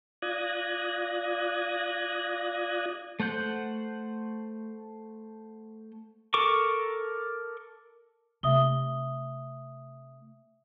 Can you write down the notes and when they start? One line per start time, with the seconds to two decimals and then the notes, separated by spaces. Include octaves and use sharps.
0.22 F4 D5 D#6 F#6 G#6 A#6
3.20 A3 C5 F#5 G6
6.34 A4 A#4 C#6 D6
8.43 C3 A3 E5 D#6 G7